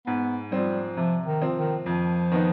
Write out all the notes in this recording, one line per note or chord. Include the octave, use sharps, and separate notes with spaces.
G#2 B3
F3 G3 C4
C3 F3
D#3
F3 C4
D#3
F2 F3
D#3 B3 D#4